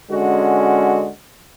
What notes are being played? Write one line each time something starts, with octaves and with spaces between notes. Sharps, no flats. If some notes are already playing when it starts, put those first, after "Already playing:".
D3 G#3 C#4 F#4